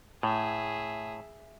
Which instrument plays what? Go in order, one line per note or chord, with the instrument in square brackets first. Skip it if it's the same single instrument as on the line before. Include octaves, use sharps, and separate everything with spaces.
[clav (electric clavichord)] A2 [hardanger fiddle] G#4 E5